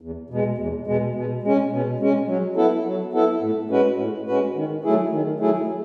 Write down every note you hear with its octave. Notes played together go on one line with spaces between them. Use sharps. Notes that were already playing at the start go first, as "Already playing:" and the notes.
E2
B2 G#3
E2
B2 G#3
B2
G#3 C#4
B2
G#3 C#4
F#3
B3 E4 A4
F#3
B3 E4 A4
A2
G#3 C#4 F#4 B4
A2
G#3 C#4 F#4 B4
D#3
F#3 A3 E4 G#4
D#3
F#3 A3 E4 G#4